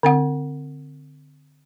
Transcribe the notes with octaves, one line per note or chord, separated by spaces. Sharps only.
D3 C4 F#5